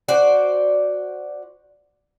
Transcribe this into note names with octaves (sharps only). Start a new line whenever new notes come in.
F#4 C5 D5